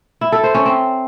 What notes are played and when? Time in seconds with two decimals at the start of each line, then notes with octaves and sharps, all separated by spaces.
0.21 E4
0.32 A4
0.43 C5
0.54 C#4
0.66 C4